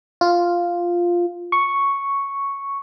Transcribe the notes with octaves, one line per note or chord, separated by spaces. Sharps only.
F4
C#6